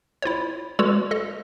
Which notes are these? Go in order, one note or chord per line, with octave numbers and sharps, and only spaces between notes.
E4 F4 C5 C#5
G#3 F#4 A4 B4 C#5 D5
A4 D#5